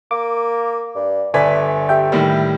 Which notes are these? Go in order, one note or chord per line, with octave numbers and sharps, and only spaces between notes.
A#3 D6
G2
G1 A3 B4 D5 G#5 B6
G4 E5 G5
A2 D#3 G3